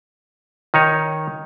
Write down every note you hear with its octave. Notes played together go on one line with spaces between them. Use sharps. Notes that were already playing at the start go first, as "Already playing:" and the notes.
D#3 D#4 C#5